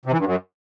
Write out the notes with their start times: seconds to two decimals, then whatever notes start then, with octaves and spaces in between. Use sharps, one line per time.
0.05 C3
0.12 E3
0.19 G2
0.25 F#2